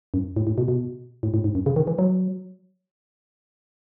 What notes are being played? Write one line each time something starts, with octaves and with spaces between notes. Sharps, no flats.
F#2
A2
A2
B2
B2
A2
A2
G#2
F#2
C#3
D#3
E3
F#3